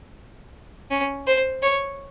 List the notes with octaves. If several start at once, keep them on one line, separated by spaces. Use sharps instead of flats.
C#4
C5
C#5